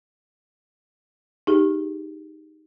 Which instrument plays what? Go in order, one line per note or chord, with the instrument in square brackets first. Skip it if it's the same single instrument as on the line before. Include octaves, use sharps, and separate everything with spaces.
[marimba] D#4 G4 G#4